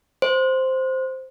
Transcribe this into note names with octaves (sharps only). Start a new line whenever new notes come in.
C5